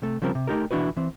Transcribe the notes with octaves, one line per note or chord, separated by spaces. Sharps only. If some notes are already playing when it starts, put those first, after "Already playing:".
C3 A3
C#3 F3 G3 C4 A#4
C3
A3 D#4 G4 A#4
B1 E3 D4 E4 F#4 B4
E3 C4